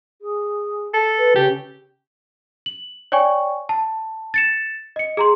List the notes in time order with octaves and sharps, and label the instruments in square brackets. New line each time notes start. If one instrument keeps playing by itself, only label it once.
[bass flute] G#4
[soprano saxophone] A4
[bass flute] B4
[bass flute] C#3 [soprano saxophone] G4
[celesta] F#7
C#5 D5 G5 G#5 C#6
A5
A6 C#7 E7
D#5 C#7
G#4 A#5 C6